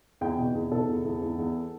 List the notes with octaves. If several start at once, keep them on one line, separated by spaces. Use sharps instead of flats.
E2 G5
B2
E2
B2 A4
E2
E2
E2
E2